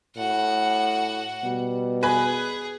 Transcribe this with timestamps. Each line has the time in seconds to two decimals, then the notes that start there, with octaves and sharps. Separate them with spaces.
0.17 A2 F#4 F#5
1.44 B2 G3
2.03 G#4 B4 G#5 B5